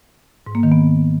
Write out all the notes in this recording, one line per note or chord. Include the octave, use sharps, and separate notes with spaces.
G#2
A#3
D#3
B3